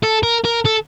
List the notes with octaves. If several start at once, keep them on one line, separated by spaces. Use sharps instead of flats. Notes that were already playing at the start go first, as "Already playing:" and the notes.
A4
A#4
A#4
A4